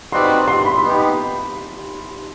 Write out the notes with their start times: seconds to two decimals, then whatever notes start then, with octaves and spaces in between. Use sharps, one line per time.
0.12 C4 D#4 F#4 B4 D5 C6
0.48 C6
0.65 B5
0.83 B3 D#4 G4